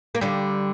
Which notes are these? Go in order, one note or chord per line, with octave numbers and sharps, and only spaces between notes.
A#3
D3 G3